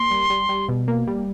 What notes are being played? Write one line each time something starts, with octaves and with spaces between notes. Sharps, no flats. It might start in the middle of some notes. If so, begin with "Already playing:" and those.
Already playing: A#3 C6
G3
G3
G3
B2
A#3
G3